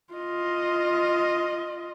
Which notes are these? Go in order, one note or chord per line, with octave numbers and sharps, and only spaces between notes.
F4 D#5